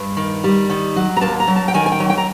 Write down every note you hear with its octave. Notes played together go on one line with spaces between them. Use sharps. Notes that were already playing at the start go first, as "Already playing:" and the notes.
Already playing: G2
D#3
G3
D#3
F#3
A#5
D#2 A5
A#5
F#3
A5
G5
D#3 G#5
G#5
G5
F#3
G5
A#5